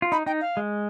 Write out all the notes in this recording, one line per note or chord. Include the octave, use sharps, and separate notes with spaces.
F4
D#4 B5
D#4 G5
F5
G#3